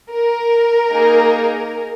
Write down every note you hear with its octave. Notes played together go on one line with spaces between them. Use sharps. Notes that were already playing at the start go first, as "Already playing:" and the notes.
A#4
A#3 D#4 G#4